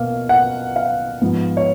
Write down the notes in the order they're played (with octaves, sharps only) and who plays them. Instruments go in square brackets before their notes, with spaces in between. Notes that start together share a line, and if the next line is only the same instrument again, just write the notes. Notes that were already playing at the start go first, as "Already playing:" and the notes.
Already playing: [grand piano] B2 A#3 F5
F#5
F5
G#2 F3 B3
C#5